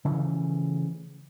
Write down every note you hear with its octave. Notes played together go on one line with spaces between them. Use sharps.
C#3 E3 F3 A3